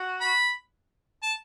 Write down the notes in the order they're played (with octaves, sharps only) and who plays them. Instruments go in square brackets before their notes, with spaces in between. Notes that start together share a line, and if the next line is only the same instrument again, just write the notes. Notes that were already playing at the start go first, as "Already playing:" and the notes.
Already playing: [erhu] F#4
[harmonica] B5
A5